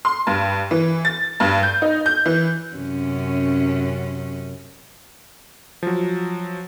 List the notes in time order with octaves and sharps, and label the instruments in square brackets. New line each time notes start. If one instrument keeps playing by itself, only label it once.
[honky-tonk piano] C6
G2
E3
A6
G2
G6
D#4
G6
E3
[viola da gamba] F#2 C3 C#4
[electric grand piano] F3 F#3